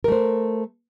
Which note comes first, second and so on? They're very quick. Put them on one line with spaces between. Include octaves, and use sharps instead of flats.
A#4 A3 C5